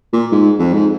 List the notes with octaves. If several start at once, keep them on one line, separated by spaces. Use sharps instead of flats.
A#2
G#2
F2
G#2